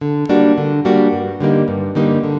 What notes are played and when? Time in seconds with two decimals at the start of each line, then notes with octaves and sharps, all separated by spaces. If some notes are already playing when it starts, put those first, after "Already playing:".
0.01 D3
0.29 G3 A#3 D4 F#4
0.58 D3
0.85 G3 A#3 D4 F#4
1.13 G2
1.40 D3 G3 A#3 D#4
1.68 G2
1.95 D3 G3 A#3 D#4
2.24 D3